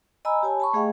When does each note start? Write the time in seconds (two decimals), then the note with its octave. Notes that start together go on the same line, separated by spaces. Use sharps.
0.25 D#5 G#5 A#5 B5 E6
0.43 G4 C#5 G#5 A5
0.60 A5 B5 C#6
0.73 A3 G#4 D#5 F5 G5